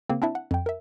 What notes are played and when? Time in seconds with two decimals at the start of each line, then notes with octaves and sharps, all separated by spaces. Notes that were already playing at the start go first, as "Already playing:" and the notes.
0.09 C#3 A#3 C4
0.22 C4 D4 E4 E5 A5
0.35 F#5
0.51 F2 G5
0.66 A#4 E5